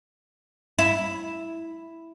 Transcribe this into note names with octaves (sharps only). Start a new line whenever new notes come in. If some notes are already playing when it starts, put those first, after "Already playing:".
E4